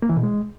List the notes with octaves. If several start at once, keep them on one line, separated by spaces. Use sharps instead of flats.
A#3
E3
B2
G#3